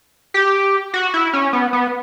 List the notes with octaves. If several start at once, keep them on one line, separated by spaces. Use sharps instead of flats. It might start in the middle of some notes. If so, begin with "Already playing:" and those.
G4
F#4
E4
C#4
B3
B3